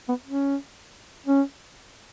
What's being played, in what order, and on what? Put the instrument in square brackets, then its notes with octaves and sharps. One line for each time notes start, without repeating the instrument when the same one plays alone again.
[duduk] B3
C#4
C#4